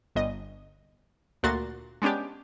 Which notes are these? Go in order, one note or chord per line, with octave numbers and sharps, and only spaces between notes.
G1 D#5
D2 A#2 F#4 A#5 C6 A6
G#3 B3 C#4 D4 G4